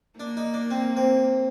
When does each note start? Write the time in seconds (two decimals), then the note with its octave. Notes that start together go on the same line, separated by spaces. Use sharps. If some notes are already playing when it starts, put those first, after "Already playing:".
0.20 A#3 D4
0.37 D#4
0.54 D4
0.70 C4
0.97 C4